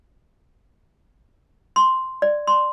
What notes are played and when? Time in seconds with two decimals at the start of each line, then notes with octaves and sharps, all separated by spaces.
1.76 C6
2.22 D5
2.47 C6